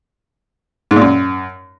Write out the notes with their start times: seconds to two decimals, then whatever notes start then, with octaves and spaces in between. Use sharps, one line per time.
0.91 G#2
0.96 A#2
1.01 F#2